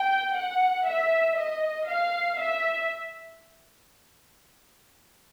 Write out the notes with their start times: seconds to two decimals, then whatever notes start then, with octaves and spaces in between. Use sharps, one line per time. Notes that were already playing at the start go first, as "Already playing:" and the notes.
Already playing: G5
0.36 F#5
0.86 E5
1.37 D#5
1.88 F5
2.38 E5